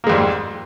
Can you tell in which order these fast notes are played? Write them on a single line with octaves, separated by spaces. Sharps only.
A#3 G#3 F2 G3 G#2